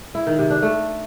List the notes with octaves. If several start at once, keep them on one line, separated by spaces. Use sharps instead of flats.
E4
D#3
C3
D4
A3